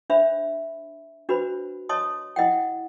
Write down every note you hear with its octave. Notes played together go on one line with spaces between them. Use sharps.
D4 C5 E5 B5
D4 F#4 B4 C5 B5
C#5 D#5 A5 C6 D#6
E4 D#5 F#5 G5